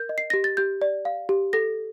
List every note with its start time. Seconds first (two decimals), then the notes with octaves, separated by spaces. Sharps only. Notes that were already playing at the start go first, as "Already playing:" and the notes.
Already playing: A#4 G6
0.09 D#5
0.18 C7
0.30 G4 A#6
0.44 A6
0.57 G4 G6
0.82 D5
1.05 F5
1.29 G4
1.53 A4 A#6